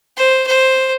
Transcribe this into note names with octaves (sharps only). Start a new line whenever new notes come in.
C5
C5